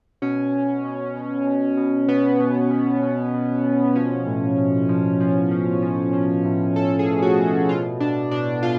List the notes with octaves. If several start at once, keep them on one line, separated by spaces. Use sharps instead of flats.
B2 C#4
B2
B2
B2
B2
B2
B2 B3
B2
B2
B2
B2
B2
F3 C#4
A2
A2
F3
F3
F3
F3
F3
A2
A2 A4
G#4
A2
F#4
A2
B2 F4
B2 D4
B2 D4
B2 F4